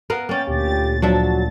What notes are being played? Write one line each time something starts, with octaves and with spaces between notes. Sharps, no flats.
B3 A#4 F5
A#3 C#4 G5 A6
D2 A#2 G4 A6
F3 F#3 D4 E5
F#3